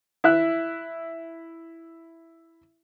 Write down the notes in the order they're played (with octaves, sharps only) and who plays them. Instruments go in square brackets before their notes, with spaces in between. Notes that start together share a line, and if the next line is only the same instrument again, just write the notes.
[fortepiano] E4 E5 F#6